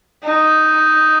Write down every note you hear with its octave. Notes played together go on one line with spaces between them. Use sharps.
D#4